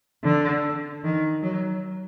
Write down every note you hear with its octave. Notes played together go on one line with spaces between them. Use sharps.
D3
D#3
F#3